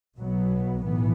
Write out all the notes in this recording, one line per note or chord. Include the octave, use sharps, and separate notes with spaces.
B1 B2 F#3 B3
B1 A2 E3 B3